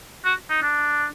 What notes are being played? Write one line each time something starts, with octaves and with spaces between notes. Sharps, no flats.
F#4
D#4
D4